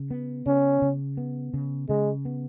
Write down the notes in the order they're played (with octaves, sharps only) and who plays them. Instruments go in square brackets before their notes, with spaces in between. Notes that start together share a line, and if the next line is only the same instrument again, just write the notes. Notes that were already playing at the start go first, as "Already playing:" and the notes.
Already playing: [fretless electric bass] C#3
B3
[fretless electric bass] C#3 [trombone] C#4
[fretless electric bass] C#3
B3
C#3
[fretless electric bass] C#3 [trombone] G#3
[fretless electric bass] B3